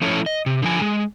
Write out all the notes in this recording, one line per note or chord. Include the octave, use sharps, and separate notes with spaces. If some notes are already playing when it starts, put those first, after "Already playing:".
F3 A3 C#4 E4 A4 C#5
D#5
C3
D3 F3 G#5
G#3